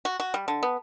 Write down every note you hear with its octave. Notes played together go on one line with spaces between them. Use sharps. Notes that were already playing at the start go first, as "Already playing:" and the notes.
F#4
F#4
G3
D3
B3